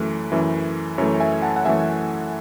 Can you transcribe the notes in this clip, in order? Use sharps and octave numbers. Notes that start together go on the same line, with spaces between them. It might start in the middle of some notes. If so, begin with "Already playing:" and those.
Already playing: F#2 E3 A3
F#2 E3 A3
F#2 E3 A3 C#5
E5 G#5
F#5 A5
F#5
F#2 E3 A3 E5 G#5